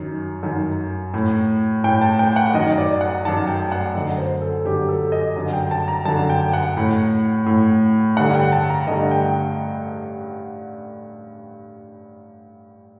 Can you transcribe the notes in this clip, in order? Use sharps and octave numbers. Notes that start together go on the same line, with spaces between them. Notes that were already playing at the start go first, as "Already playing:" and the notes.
Already playing: F#2 D#3
F#2 D#3
A2
A2 G5
A5
G5
F#5
F#2 D#3 D#5
D5
F#5
F#2 D#3 A5
G5
F#5
F#2 D3 D#5
C5
A4
F#2 D3 G4
A4
D#5
F#2 D3
G5
A5
A#5
F#2 D3 A5
G5
F#5
A2
A2
G2 D3 F#5
G5
A5
A#5
G2 D3 D#5
G5